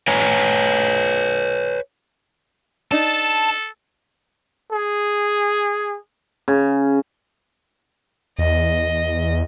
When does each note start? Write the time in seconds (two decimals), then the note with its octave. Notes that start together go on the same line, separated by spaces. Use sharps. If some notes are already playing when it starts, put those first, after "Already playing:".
0.08 B4 C#5 G#5 A#5
2.92 D4 D#4 A4 A5
4.72 G#4
6.48 C#3
8.39 E2 D#5